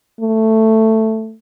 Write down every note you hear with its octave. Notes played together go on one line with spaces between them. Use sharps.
A3